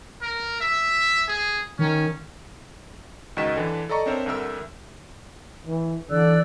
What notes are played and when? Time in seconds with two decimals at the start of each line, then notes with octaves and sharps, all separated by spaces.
0.22 A#4
0.60 E5
1.28 G#4
1.79 D#3 C#4
3.37 C#2 D#3 F#4 D#5 B6 E7
3.56 D3 E3 D4
3.89 A4 D5 D#5 A#5 C#6
4.06 C4 D4 A#4 C5 C#5 E5
4.26 C2 D3 A#4 E5 E6
5.67 E3
6.10 D3 E3 D5 E6 F#6